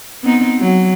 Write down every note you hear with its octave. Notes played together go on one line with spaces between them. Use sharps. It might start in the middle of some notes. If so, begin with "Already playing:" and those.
B3 C4 D#4
F#3